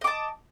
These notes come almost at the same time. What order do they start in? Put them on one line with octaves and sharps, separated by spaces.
D#5 D6 A5